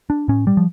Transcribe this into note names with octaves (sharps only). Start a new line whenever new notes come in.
D4
A2 C#4
G3
F3